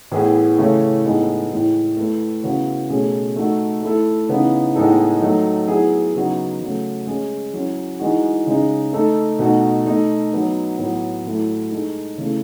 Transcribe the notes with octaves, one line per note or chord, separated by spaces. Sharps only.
A2 E3 B3 E4 G#4
C#3 E3 A3 C#4 E4
A2 G#3 B3 D#4 A4
A2 E3 G#3
A3 E4 B4
C#3 E3 B3 F#4 B4
B2 A3 C#4 G#4
A3 D#4 F#4 A4
A3 E4 A4
C#3 E3 B3 D#4
A2 G#3 B3 D#4 A4
F#3 A3 D#4
F#3 B3 E4 G#4
C#3 F#3 B3 D#4 F#4
C#3 F#3 A3
G#3 C#4 G#4
F#3 C#4 E4
E3 G#3 D#4 F#4
C#3 G#3 D#4
A3 D#4 A4
B2 A3 D#4 F#4
A3 D#4 A4
F#3 B3 D#4
A2 F#3 B3
A2 F#3 A3 E4
G#3 D#4 A4
C#3 E3 A3